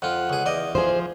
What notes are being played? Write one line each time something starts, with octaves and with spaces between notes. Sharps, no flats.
F2 F4 F#5
C#2 G#4
E2 D5 D#5
F3 G#4 C5